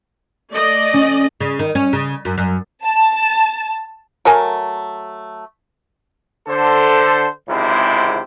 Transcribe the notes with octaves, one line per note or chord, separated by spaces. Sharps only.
A3 D5 D#5
C#4
C#3
D#3
C#4
C#3
F#2
F#2
A5
F#3 A3 A#4 G#5
D3 A4 C5
G#1 C#2 G#2 C3 E4 C5